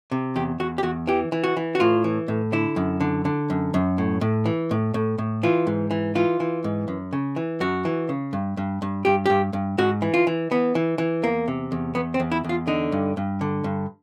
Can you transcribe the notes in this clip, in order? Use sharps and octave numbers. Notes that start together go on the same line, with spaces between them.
C3
E2 G4
E2 F#4
G4
E2 F#4
E3 G4
E3
F#4
E3
F#4
A2 F4
E3
A2
D3 E4
F#2
D3
D3
F#2
F#2
A2
A2
E3
A2
A2
A2
E3 F4
G#2
E3
E3 F4
E3
G#2
F#2
C#3
E3
F#2 F#4
E3
C#3
G2
G2
G2
G2 G4
G2 G4
G2
G#2 F#4
E3
F4
E3
E3 B3
E3
E3
E2 A#3
C3
E2
E2 B3
C4
E2
E4
E2 F4
D3 D#4
G2
G2
D3
G2